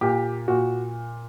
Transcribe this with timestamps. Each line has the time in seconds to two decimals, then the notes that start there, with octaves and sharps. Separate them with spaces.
0.01 A#2 G4
0.48 A#2 F#4